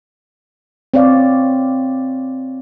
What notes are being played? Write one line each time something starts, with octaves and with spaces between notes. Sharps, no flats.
C4 C#5 D5 F5